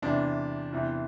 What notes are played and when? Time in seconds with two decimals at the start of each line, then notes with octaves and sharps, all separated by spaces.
0.02 E2 C3 E3 D4
0.72 E2 C3 E3